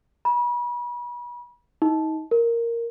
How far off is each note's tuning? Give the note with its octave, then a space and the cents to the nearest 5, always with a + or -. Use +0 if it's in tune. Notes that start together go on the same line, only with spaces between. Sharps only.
B5 -35
D#4 +30
A#4 -5